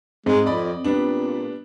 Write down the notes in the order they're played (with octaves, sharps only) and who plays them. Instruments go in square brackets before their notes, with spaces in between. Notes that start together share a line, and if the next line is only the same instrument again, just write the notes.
[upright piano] G#2 D#4 [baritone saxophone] G#3 [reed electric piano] C4
[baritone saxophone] F2 [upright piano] D5 D#5 B5
[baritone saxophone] A#2 [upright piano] G3 B3 D4